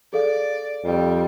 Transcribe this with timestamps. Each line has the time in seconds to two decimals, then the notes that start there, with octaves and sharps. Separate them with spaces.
0.13 G#4 A4 D5 F5
0.85 F2 G3